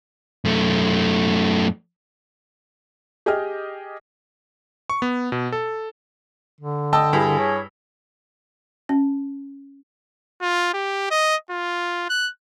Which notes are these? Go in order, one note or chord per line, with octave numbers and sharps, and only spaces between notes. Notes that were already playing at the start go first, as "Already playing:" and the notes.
F#2 A3
G4 G#4 D#5 G5 F6
C#6
B3
B2
A4
D3
D#5 G5 A5 E6
G2 E4 G#4
C#5
C#4
F4
G4
D#5
F4
F#6